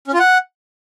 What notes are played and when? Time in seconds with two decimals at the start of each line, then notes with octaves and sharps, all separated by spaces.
0.08 C#4
0.14 F4
0.19 F#5